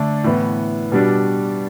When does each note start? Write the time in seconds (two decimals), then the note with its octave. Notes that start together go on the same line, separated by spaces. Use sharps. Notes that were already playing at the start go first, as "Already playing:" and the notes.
Already playing: D3 A3 D4
0.24 A2 E3 B3
0.92 B2 G3 D4